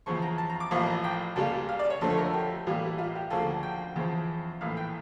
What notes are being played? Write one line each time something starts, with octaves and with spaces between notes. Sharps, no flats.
E2 C#3 F3 C#6
A#5
A5
A#5
D6
A1 A2 F3 A#3 C#6
A#5
G5
C#2 C#3 G3 A#3 A5
F5
D5
C#5
F2 D3 F3 A3 A4
C#5
A#4
A4
G4
A2 E3 G3 A#3
F4
G4
D2 C#3 F3 A#3 A4
G5
E2 C#3 F3
A#1 A2 E3 F5
G5